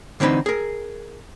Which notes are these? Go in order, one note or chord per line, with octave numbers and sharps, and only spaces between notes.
D3 E3 C4 D#4 B5
G#4 A#4